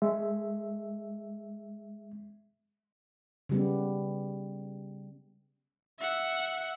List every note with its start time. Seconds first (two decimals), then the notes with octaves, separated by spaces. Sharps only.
0.02 G#3 E5
3.49 C#3 G3 B3
5.99 E5 F#5